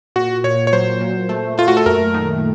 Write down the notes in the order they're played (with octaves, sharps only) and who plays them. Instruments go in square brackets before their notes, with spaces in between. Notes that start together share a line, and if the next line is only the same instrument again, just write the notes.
[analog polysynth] A#2 [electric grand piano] F#4
[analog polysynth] A#2 [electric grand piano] C#5
[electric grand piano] C#5
[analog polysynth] F#3 [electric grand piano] C5
[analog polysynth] A#2
A3
[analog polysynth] A3 [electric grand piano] F4
[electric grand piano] F#4
A4
[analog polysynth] F#2 [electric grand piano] A#4
[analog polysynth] D#3